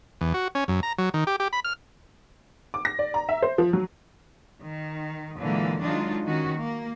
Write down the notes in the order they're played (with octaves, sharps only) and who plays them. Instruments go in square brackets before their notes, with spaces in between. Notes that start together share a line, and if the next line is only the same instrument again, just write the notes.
[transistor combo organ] E2
F#4
C#4
F#2
A#5
F#3
D#3
G4
G4
B5
F6
[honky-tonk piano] D6
A#6
D5
A#5
E5
C5
F3
F#3
[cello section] D#3
A#2 D3 E3 F#3 G#3 A#3
D#3 F#3 G#3 D4 D#4 F4
D#3 C#4 F#4
A#3